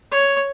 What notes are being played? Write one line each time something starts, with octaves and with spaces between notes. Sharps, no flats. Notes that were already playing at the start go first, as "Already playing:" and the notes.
C#5